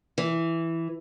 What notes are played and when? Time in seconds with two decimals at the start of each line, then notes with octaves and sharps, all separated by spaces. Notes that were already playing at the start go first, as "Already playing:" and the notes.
0.18 E3